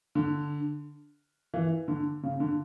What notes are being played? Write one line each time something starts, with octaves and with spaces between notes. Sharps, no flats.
D3
E3
D3
C#3
D3